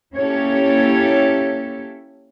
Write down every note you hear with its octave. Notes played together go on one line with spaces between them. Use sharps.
A#3 C#4 E4 G4 A4 C#5